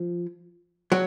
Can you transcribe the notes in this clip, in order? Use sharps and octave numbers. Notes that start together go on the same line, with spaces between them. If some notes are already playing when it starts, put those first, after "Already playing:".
Already playing: F3
F#3